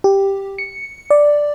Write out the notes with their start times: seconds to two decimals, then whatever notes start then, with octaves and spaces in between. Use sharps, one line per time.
0.04 G4
0.58 C#7
1.10 D5